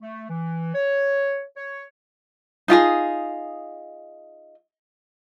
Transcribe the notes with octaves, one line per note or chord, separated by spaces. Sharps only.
A3
E3
C#5
C#5
D#4 F4 G4 G#4